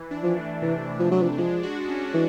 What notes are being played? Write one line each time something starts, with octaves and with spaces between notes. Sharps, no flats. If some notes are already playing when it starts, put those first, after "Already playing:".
Already playing: E3
D4
F3
A3
C3 E3
E3
F3
F#3 D4
F3
F3 G#3
F#4
C#4
E3